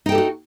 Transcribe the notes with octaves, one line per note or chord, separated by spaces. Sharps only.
D#4 F#4 G4 A4 G5